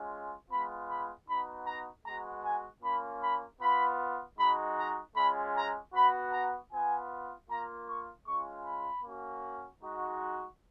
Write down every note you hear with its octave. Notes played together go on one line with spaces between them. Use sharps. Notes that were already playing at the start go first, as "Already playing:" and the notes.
Already playing: G#3 C#4 F4
G#3 B3 F4 B5
B5
B3 D#4 F#4 B5
A#5
G#3 B3 F#4 A#5
G#5
A#3 C#4 F4 B5
B5
B3 F4 B5
G#3 D#4 F#4 B5
A#5
G#3 C#4 F4 B5
A#5
B3 F#4 B5
A#5
B3 F4 G#5
A#3 F4 A#5
C#6
G#3 C#4 F4 C#6
B5
A#3 C#4 F#4
G#3 D#4 F#4